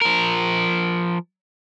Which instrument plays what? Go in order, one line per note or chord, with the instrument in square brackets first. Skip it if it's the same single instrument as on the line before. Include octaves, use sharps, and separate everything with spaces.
[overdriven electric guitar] F3 A#4